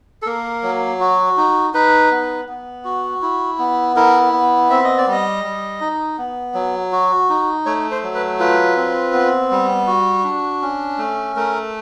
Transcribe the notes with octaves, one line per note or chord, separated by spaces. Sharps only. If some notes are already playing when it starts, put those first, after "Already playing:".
A4
A#3 A#4
F#3
F#4
D#4
D#4 B4
B3
B3
F#4
E4
B3
E4 A#4
B3
C4 E5
D#5
D5
G3 D#5
G3
D#4
B3
F#3
F#4
D#4
A3 C#5
C5
F#3
B4
F4 B4
C4
B3
G3
F#4
D4
C#4
A3
A3 A#4